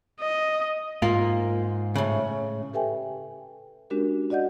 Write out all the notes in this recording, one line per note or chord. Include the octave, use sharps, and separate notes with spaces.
D#5
G#2 A#3 F4 A#4
A2 C#3
G4 A4 B4 E5 G5 G#5
G#3 C#4 D4 F#4 G4 A#4
F#4 D5 D#5 F#5 G6